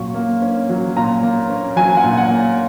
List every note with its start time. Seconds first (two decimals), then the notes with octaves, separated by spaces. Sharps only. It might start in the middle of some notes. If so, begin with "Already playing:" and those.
Already playing: A#2 F#3 C#4 C#6
0.14 A#3
0.42 C#4
0.69 F#3
0.96 A#2 A#5
1.23 A#3
1.50 C#4
1.76 F#3 G#5
1.97 F#5
2.04 A#2
2.17 F#5
2.30 A#3